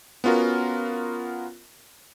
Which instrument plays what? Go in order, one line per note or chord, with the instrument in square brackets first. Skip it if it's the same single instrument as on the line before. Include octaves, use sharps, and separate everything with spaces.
[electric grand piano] B3 C#4 F4 F#4 A#4